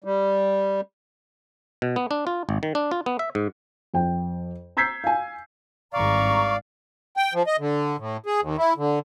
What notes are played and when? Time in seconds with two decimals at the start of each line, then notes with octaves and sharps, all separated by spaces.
0.04 G3
1.82 B2
1.96 B3
2.11 D4
2.27 F4
2.49 G#1
2.63 D#3
2.75 D4
2.91 F4
3.06 B3
3.19 E5
3.35 G#2
3.94 F2 G5
4.77 A#5 E6 G6 G#6 B6 C7
5.04 F5 G#5
5.93 G#1 G2 D5 F5 A#5 C#6
7.17 G5
7.34 F3
7.47 D#5
7.59 D3
7.99 A2
8.26 G#4
8.41 D#2
8.58 E4
8.77 D3